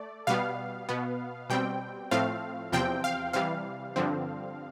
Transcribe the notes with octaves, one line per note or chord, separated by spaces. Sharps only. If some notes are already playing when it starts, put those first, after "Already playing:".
Already playing: A3 D5
B2 G3 B3 F5
B2 B3
B2 G3 C4 G5
A2 F3 A3 C4 F5
E2 C3 F3 C4 G5
F5
C3 E3 G3 F5
G2 D3 F3 C4